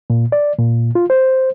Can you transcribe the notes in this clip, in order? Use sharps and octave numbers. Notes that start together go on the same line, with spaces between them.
A#2
D5
A#2
F4
C5